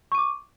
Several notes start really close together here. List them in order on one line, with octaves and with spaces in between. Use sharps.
C#6 D#7 D6